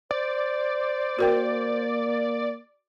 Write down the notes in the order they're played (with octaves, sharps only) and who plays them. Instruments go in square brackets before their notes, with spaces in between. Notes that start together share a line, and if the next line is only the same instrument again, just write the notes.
[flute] C5 [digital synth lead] D5
[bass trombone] A#3 [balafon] F#4 A#4 G5